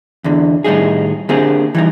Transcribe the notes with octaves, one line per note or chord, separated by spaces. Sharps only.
E2 D3
A2 D#3 G3 D#4 G#4
D3 A#3 C4 G4 G#4
E3 G3 D#4